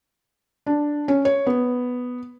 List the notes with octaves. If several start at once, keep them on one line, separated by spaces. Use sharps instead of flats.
D4
C#4
C#5
B3